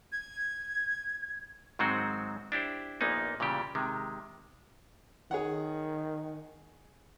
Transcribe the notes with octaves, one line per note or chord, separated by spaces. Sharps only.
G#6
G#2 D#3 F#3 G#3 C4 F#4
D4 E4 G4 C5
A#1 A#2 A#3 B3 D#4
A#2 C#3 E3 G3 G4
C3 D#3 G#3
D#3 G#4 C#5 F#5